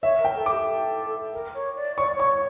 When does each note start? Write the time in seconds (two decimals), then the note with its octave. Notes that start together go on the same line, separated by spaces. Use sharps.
0.02 C#5 E5
0.19 A#4
0.25 G5
0.35 A4
0.46 D6
0.51 G4
0.68 A4
1.33 A#4
1.54 C#5
1.76 D5
1.98 C#5 C#6
2.06 D5
2.15 C#5 C#6